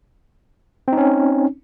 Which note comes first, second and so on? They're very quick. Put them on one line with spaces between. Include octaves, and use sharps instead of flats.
C4 D#4 C#4